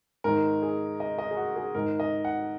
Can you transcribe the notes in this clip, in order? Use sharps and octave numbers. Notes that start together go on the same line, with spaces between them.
G#2 D#3 A#4
G#4
D#5
D#5
G#4
F#4
G#4
G#2 D#3 A#4
D#5
F#5